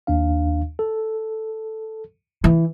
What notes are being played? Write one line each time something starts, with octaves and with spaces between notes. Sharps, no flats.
D#2 D4 F5
A4
E3